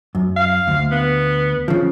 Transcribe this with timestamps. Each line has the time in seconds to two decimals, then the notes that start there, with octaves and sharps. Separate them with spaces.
0.15 F#2
0.36 F5
0.68 D2
0.91 B3
1.68 C#3 F3